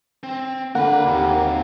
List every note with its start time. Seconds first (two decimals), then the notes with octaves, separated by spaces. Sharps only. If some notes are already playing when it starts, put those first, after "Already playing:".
0.23 C4
0.75 D3 A#3 A#4 F#5 B5
1.06 D#2 D#3 C4